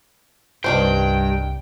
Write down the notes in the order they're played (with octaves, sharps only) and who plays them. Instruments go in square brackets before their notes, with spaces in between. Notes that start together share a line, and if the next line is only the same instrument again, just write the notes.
[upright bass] C2 [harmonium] G2 [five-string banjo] D#3 D4 C5 [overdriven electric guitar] G5